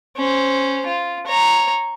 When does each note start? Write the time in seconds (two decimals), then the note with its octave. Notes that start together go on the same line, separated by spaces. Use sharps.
0.17 C#4 C5
0.86 F4
1.27 C#5 A#5